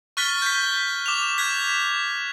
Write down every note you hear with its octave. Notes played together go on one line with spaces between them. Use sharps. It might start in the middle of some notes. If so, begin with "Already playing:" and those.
C#6 F6 F#6 A6 B6 G7
G6 B6
D6 F7
F#6 G#6 B6